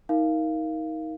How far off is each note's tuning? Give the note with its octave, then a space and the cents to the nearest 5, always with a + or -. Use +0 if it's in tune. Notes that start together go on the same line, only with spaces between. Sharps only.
D#4 +25 A#4 +0 F5 -15